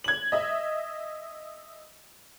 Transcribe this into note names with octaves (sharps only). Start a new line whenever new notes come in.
G#6 F#7
D#5 E5